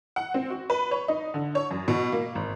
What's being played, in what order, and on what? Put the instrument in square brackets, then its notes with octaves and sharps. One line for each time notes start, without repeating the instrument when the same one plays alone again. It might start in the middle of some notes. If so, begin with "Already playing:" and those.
[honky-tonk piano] F#5
C4
F#4
B4
C#5
D#4
D3
C#5
F#2
B2
A#3
G#1